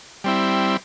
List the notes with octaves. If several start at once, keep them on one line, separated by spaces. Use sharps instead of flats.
G3 C4 E4